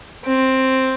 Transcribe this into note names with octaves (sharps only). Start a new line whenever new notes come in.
C4